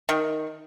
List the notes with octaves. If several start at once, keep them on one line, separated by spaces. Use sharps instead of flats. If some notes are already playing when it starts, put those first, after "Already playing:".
D#3